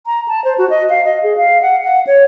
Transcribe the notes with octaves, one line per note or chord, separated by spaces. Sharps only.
A#5
A5
C5
F#4
D#5
F5
D#5
G#4
F5
F#5
F#5
C#5